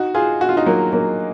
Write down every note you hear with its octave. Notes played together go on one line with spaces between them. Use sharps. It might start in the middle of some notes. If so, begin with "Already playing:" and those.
Already playing: D#4 F#4
F4 G#4
F#4
F4
D#4 F#4
F#3 A#3
F#3 A#3